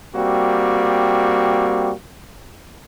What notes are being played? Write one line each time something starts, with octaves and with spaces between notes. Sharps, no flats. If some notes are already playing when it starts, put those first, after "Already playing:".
G3 A#3 C4 F#4